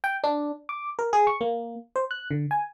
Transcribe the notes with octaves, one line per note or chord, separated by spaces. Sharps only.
G5
D4
D6
A#4
G#4
C#6
A#3
C5
F#6
D3
G#5